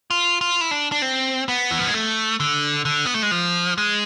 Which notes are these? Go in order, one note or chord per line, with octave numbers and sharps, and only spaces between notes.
F4
F4
E4
D4
D4
C4
B3
E3
F3
G#3
A3
D3
D3
B3
A3
G#3
F3
G#3